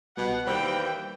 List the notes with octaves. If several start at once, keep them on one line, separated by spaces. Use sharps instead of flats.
C2 B2 G3 F#5
D#2 E3 G3 C5 G5 E6 G6